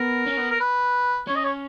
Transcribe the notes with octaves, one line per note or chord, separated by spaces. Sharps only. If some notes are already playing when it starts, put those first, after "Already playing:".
Already playing: B3 A#4
C#4
B3
A#4
B4
C#4 C#5
D#5
C#5